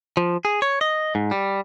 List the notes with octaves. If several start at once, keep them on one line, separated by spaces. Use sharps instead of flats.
F3
G#4
C#5
D#5
G#2
G3